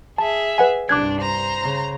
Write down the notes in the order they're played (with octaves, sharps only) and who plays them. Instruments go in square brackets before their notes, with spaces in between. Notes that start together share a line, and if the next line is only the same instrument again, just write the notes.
[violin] G#4 E5 [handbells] A5
[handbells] B4 F#5 G#5
[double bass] C2 G2 [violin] D4 [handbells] D6 F#6 G#6
[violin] C5 A#5
[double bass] C#3